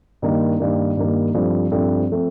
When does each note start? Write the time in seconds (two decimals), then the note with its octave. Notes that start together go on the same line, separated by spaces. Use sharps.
0.22 G2 D#3 A#3
0.60 G2 D#3 A#3
0.97 G2 D#3 A#3
1.34 G2 F3 A3 C4
1.71 G2 F3 A3 C4
2.10 F3 A3 C4